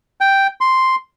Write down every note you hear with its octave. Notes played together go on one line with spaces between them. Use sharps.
G5
C6